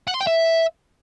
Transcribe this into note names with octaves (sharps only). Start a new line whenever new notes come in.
F#5
C6
G5
E5